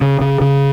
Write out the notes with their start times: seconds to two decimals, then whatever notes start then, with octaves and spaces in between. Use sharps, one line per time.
0.01 C#3
0.21 C#3
0.41 C#3